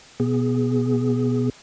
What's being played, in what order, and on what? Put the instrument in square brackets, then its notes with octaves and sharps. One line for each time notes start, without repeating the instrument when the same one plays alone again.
[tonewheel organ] B2 B3 G#4